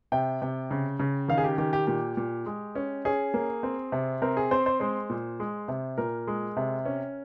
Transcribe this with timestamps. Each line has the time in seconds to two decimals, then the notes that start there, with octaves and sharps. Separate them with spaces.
0.12 C3 G5
0.42 C3
0.71 C#3
0.99 C#3
1.28 D#3 F5
1.38 G#4
1.44 G4
1.58 D#3 G4
1.73 G4
1.87 A#2 G4
2.17 A#2
2.46 G#3
2.75 C#4
3.05 C#4 G#4
3.34 A#3
3.63 C4
3.92 C3
4.22 C4 A#4
4.37 G#4
4.51 C4 C5
4.66 C5
4.80 G#3 C5
5.10 A#2
5.40 G#3
5.68 C3
5.98 A#2 A#4
6.27 G#3
6.57 C3
6.85 C#4